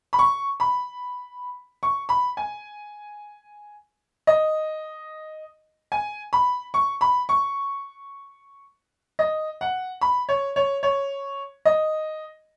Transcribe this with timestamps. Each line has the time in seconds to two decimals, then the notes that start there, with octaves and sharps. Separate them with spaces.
0.13 B5
0.19 C#6
0.60 B5
1.83 C#6
2.09 B5
2.37 G#5
4.27 D#5
5.92 G#5
6.33 B5
6.74 C#6
7.01 B5
7.29 C#6
9.19 D#5
9.61 F#5
10.01 B5
10.29 C#5
10.56 C#5
10.83 C#5
11.65 D#5